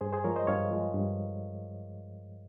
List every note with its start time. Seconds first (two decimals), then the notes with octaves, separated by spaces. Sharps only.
0.01 G2 G#4 C5
0.13 G#4 C5
0.24 F3 G#3 A#4 C#5
0.36 C5 D#5
0.47 G2 C#5 F5
0.71 F3 G#3
0.94 G2